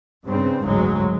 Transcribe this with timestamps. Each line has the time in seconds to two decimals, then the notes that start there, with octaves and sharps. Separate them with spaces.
0.25 G2 C#3 C4
0.63 F#1 D2 G#2 F#3 G#3